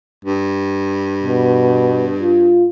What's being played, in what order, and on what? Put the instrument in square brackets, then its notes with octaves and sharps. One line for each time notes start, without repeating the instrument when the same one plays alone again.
[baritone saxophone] G2
[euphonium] B2
F4